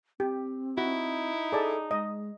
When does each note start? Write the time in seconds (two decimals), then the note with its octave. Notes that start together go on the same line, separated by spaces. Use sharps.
0.20 C4 G4
0.78 D#4 E4 F#4
1.52 G#4 A4 D5 A5
1.91 G#3 D#5